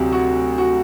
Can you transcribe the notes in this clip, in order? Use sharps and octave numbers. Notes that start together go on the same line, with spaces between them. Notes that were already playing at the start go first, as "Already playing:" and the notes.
Already playing: D2 C3 F#3 G4
F#4
F#4